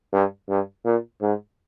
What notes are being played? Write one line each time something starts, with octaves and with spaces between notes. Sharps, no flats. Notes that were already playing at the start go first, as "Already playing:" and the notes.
G2
G2
A#2
G#2